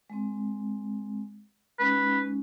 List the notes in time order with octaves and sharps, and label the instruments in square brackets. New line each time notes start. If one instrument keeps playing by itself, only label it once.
[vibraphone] G#3 C4
[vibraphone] G#3 C#4 D#4 [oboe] B4